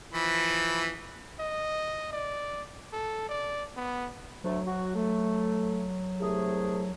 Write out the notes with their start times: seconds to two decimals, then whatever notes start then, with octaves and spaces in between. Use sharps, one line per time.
0.14 E3 F3 B5
1.40 D#5
2.13 D5
2.93 A4
3.29 D5
3.77 B3
4.44 D2 F#3 A3
4.66 F#4
4.95 A3
6.20 C2 A3 G#4